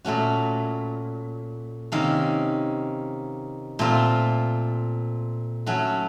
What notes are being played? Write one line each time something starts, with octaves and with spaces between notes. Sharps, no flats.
A#2 A3 C#4 F#4
C3 D#3 A#3 C#4
A#2 A3 C4 F4
F#3 A3 C#4 F#4